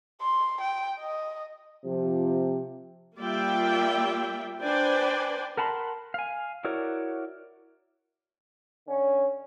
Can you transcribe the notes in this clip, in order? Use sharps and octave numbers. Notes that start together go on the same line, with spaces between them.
C6
G5
D#5
C3 F3 G4
G3 A#3 F4 D5 E5 G5
D4 B4 C5 D5 G5 G#5
A#4 F#5 A5 B5 C6
F5 G#5
E4 F#4 A#4 C#5 D5
D3 C#4